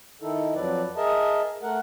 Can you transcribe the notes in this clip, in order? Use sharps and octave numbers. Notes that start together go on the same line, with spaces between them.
D#3 D#4 E4 A4
F2 F3 F#3 B4 D5
G#4 A#4 D#5 E5 A5
A3 A#4 F#5